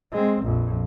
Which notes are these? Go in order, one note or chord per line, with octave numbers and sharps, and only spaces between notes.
G#3 C4
A#1 F2